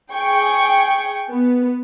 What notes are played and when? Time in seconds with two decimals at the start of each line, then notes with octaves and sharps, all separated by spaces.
0.12 G#4 G5 C#6
1.29 B3